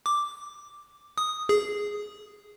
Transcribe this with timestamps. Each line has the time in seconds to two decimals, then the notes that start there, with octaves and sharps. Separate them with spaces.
0.06 D6
1.18 D#6
1.49 G#4